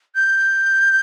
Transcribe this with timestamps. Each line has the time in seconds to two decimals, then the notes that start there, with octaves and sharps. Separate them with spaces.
0.15 G6